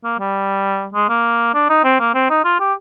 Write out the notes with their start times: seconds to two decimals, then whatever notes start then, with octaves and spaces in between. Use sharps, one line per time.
0.04 A#3
0.19 G3
0.94 G#3
1.09 A#3
1.54 D4
1.70 D#4
1.84 C4
2.00 A#3
2.15 C4
2.30 D#4
2.45 F4
2.60 G4